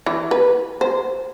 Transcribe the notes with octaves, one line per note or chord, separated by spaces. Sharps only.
E3
B4
C5